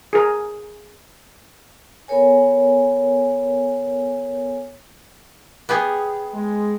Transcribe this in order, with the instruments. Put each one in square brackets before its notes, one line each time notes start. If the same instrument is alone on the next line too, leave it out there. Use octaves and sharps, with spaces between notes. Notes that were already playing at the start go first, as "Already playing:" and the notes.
[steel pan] G#4 A#4
[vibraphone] B3 A4 A#4 C#5 G#5
[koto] B3 G4 G#4
[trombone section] G#3